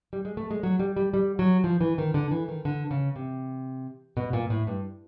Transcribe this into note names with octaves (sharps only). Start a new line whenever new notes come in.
G3
G#3
A3
G#3
F#3
G3
G3
G3
F#3
F3
E3
D#3
D3
E3
D#3
D3
C#3
C3
B2
A#2
A2
G2